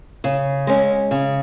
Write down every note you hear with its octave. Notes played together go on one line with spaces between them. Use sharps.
C#3
G#3 C#4
C#3